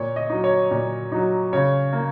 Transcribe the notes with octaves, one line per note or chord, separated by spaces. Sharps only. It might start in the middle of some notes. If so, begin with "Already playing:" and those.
Already playing: A#2 C#5
D#5
F#3 D#4
C#5
A#2
F#3 D#4
C#3 C#5
A#3